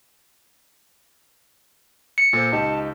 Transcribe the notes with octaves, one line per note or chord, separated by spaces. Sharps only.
C#7
A#2 A4 C5
C#2 D#4 G4 A5